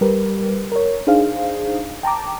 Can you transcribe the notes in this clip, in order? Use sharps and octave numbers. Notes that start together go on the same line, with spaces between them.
G3 G4 A#4 B4
A#4 C#5
D4 D#4 G#4 C5 F5
G5 A5 A#5 D6